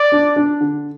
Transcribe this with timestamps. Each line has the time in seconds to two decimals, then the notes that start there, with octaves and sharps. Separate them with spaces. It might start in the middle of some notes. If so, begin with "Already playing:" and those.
Already playing: D5
0.12 D4
0.36 D4
0.60 D3